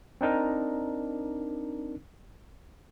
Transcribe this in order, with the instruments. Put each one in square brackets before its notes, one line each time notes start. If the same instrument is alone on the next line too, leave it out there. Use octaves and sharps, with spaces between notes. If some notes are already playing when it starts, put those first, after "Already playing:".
[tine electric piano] C4 D4 D#4 A#4